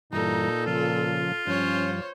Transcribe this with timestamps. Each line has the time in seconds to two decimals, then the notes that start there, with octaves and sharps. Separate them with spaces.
0.13 G2 A#2 E3 D#4 A4 A#5
0.66 C#3 F3 F4
1.47 G2 F3 C#4 C5 C#5